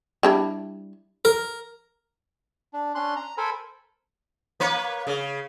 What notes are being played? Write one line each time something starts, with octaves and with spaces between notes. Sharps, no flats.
G3 D4 E4
A#4
D4
C#4 D4 C6 F#6
A#5
A4 A#4 C5 G#5 B5
A#3 B4 C#5
C#3